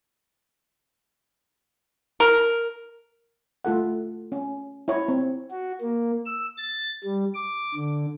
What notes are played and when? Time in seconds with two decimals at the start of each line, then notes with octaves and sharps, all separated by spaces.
2.20 A#4
3.65 A3 F4 A4 F#5
4.32 C#4
4.88 E4 C#5
5.08 C4
5.51 F#4
5.82 A#3
6.26 E6
6.58 A6
7.04 G3
7.34 D6
7.75 D3